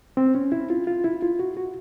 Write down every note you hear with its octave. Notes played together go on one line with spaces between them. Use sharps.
C4
C#4
E4
F4
F4
E4
F4
F#4
F#4